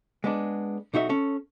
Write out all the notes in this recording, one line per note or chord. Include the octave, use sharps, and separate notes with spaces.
G#3 B3 D4
B1 D#4 F#4 E5
C#4 A4